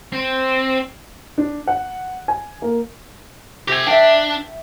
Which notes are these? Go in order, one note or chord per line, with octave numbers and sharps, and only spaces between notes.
C4
D4
F#5
G#5
A#3
C3 G4 G#5
D4 E5 G5